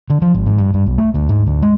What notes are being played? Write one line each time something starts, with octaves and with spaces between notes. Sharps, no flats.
D3
F3
G#1
G#2
G2
G2
B1
A3
D2
G#2
D2
G#3